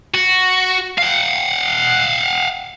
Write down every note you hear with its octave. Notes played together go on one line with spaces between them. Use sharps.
F#4
F5 F#5